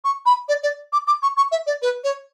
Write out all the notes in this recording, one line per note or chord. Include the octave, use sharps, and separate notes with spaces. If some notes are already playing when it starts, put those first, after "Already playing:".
C#6
B5
D5
D5
D6
D6
C#6
C#6
E5
D5
B4
C#5